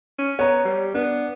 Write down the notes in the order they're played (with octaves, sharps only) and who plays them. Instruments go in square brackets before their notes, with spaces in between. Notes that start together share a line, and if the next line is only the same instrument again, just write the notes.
[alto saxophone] C#4
[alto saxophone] B3 [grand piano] C#5 A#5
[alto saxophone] G3
[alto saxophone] B3 [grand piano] D4